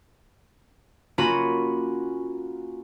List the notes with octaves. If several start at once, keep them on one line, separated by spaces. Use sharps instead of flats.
A#3 C#4 F4 F#4 B5 D#7